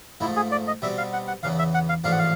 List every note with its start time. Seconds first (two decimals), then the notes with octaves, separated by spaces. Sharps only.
0.20 G#2 F3 A3 E4
0.36 G#4
0.52 D5
0.67 D#5
0.82 B2 G3 C4 E5
0.98 F5
1.13 F#5
1.28 F#5
1.43 E2 C#3 E3 F5
1.59 E5
1.74 F#5
1.89 F5
2.04 A1 G#2 F3 A3 D4 F5
2.12 F#5
2.19 F5